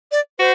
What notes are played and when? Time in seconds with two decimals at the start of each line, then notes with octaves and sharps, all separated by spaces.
0.12 D5
0.39 F#4 C5